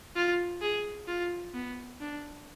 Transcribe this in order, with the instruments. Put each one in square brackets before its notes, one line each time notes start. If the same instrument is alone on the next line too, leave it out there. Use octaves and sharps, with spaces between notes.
[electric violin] F4
G#4
F4
B3
D4